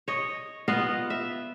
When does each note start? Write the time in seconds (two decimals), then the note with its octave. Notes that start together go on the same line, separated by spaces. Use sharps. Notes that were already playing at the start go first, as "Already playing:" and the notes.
0.08 C#5 D#5
0.68 B3 F4 D#5 F5
1.10 E5